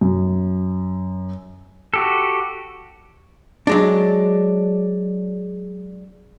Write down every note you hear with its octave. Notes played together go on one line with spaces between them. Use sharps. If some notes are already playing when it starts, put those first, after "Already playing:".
F#2
F#4 G4 A4
F#3 G#3 D4